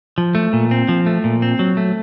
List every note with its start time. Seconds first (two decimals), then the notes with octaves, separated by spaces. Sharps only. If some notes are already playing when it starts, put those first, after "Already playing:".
0.18 F3
0.35 A3
0.53 A#2
0.71 C4
0.89 F3
1.06 A3
1.24 A#2
1.42 C4
1.59 F#3
1.77 A3